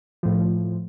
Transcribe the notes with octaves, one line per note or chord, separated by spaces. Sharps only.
A2 F3